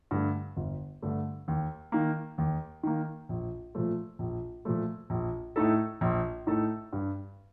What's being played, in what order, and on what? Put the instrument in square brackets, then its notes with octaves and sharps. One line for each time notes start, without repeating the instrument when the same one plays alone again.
[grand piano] G2 D3 A3
G1
G2 D3 A3
D#2
D#3 A#3
D#2
D#3 A#3
A#1
A#2 F3 A3
A#1
A#2 F3 A3
A#1
A2 A3 D#4 A4
A#1
A2 A3 D#4 A4
G2